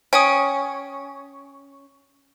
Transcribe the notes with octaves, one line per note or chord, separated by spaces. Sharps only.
C#4 G5 G#5 D#6